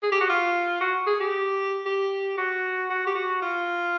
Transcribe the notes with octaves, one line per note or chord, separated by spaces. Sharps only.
G#4
G4
F#4
F4
F#4
G#4
G4
G4
F#4
F#4
G4
F#4
F4